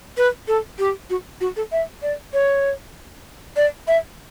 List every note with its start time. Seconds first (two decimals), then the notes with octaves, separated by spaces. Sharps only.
0.17 B4
0.48 A4
0.79 G4
1.10 F#4
1.41 F#4
1.56 A4
1.72 E5
2.02 D5
2.33 C#5
3.56 D5
3.88 E5